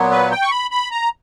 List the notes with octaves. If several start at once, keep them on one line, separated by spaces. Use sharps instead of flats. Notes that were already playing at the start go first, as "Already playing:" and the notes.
Already playing: A#2 F#3 B3
B4
G5
C#6
B5
B5
A#5